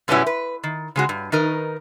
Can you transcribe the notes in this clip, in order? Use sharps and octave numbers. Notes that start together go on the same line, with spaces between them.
F#2 B2 G3 B3 C#4 E4
B4
D#3
C#3 G#3 F#4
G2
D#3 D#4 A#4 B4